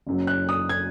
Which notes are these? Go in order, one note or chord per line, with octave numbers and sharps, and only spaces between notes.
F#1 F#2 F#3
F#6
D#6
G#6